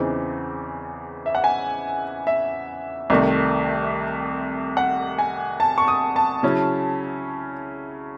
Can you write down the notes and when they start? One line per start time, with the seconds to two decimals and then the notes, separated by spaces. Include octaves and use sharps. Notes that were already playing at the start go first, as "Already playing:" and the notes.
Already playing: E2 C#3 E3 C4 D#4
1.26 E5
1.35 F#5
1.44 G#5
2.27 E5
3.10 C2 C3 D#3 A3
4.77 F#5
5.19 G#5
5.60 A5
5.78 C#6
5.88 D#6
6.16 A5
6.43 C#3 F#3 C#4 E4